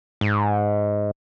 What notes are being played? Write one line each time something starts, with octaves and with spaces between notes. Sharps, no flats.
G#2